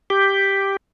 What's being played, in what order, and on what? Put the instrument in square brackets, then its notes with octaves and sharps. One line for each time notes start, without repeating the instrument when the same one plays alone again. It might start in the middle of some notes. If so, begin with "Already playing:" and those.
[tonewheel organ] G4